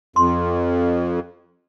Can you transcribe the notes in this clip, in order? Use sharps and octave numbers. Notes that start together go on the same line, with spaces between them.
F2 C6